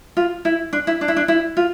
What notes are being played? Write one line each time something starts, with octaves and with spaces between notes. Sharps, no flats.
F4
E4
D4
E4
D4
E4
D4
E4
F4